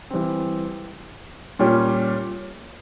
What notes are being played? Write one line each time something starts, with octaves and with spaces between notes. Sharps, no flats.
E3 G3 C4
A#2 G3 C#4